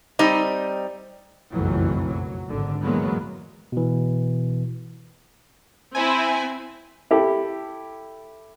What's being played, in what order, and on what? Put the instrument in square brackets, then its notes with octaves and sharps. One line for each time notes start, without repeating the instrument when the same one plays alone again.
[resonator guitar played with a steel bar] G3 C4 D#4
[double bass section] F#1 B1 F2 A2 E3 F#3
F#3
G#1 D3
E2 A2 F#3 G#3 A#3 B3
[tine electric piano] B2 E3
[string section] C4 E4 [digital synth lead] G#5
[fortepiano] E4 G4 A4